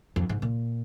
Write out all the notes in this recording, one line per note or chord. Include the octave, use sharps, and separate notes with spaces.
F2
G#2
A#2